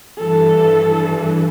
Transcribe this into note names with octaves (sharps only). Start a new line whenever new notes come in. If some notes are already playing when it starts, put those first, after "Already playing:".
G2 E3 A4